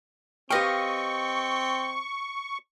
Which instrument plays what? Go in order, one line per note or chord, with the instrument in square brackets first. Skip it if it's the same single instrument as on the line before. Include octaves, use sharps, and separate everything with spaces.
[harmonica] C4 [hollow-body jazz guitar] G4 B4 G5 [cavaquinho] D#5 F5 [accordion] C#6